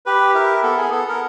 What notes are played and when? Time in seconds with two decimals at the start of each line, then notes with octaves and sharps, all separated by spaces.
0.06 G4 B4
0.35 E4 A#4
0.63 B3 A4
0.78 G#4
0.91 B3 A4
1.09 A#4